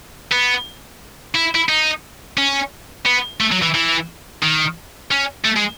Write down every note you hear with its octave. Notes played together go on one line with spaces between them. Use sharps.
B3
E4
E4
D#4
C#4
B3
A3
F#3
E3
E3
D#3
C#4
A3
G#3